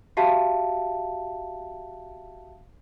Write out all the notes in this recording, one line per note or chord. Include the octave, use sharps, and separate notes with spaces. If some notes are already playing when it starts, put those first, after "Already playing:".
F#4 G4 E5 F5 A5